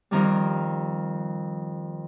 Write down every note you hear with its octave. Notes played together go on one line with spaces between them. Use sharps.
F2 D#3 G3